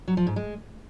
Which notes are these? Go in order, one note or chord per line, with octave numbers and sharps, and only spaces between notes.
F#3
F3
G#2
G#3